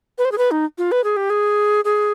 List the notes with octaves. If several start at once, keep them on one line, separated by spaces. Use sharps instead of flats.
B4
C5
G#4
B4
D#4
F4
B4
G#4
G4
G#4
G#4